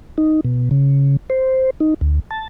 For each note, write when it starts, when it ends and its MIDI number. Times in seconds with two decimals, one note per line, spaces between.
0.18 0.40 63
0.45 0.69 47
0.71 1.17 49
1.30 1.70 72
1.80 1.94 63
2.01 2.19 38
2.31 2.48 81